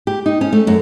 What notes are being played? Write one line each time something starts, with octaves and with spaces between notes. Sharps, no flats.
G4
D#4
C#4
A3
F#2